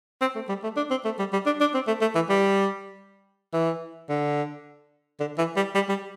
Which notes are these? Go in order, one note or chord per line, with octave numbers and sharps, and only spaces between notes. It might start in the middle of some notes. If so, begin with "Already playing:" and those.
C4
A3
G3
A3
D4
C4
A3
G3
G3
D4
D4
C4
A3
A3
E3
G3
E3
D3
D3
E3
G3
G3
G3